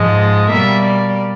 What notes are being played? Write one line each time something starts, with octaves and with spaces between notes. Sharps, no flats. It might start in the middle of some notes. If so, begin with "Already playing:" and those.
Already playing: G#2 F3 G#3 D#5
B2 G3 A#3 E5
D5